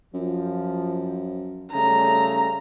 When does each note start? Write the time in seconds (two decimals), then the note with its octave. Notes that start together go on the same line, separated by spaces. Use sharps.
0.14 F#2 F3
1.73 C#3 G3 A3 C#4 A#5